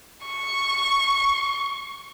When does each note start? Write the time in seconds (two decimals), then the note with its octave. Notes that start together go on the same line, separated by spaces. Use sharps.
0.24 C#6